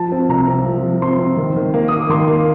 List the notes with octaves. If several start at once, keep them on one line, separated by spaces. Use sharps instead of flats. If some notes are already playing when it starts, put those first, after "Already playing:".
Already playing: F3 A5
C4
C2 A#5
C4
F3
F3
C4 C6
C4
D#3
D#3
A#3
A#3 D#6
D6
D#3 C6
A#3